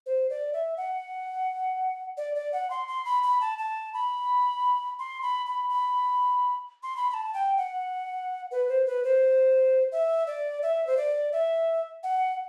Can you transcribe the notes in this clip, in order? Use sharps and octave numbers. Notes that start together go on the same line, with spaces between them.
C5
D5
E5
F#5
D5
D5
F#5
C6
C6
B5
B5
A5
A5
B5
C6
B5
B5
B5
C6
B5
B5
A5
G5
F#5
B4
C5
B4
C5
E5
D5
E5
C5
D5
E5
F#5